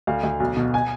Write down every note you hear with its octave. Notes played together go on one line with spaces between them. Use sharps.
D2 F5
D2
B1
B2
G#5